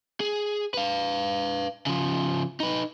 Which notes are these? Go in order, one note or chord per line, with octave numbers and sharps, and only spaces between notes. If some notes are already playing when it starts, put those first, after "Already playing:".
G#4
B4 F5
C#3 F3
D#4 B4